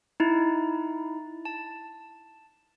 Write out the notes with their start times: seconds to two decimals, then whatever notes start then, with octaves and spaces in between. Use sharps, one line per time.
0.20 D#4 E4
1.45 A5